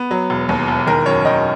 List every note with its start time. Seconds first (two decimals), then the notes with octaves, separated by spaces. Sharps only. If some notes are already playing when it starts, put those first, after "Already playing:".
Already playing: B3
0.11 F#3
0.30 E1
0.49 D#2
0.68 E1
0.87 D#3 A#4
1.06 F#2 C#5
1.25 D#3 D#5